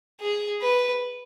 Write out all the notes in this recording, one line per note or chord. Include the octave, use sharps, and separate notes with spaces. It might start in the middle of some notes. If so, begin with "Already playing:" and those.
G#4
B4